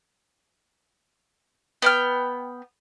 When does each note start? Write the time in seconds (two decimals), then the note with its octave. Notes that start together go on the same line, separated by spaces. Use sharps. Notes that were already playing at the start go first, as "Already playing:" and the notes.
1.82 B3 G5 F6